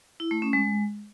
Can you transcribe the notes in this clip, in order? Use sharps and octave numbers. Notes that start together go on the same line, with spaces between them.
E4
A3
C#4
G#3